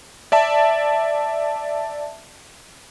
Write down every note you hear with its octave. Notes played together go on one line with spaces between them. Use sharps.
D5 E5 A5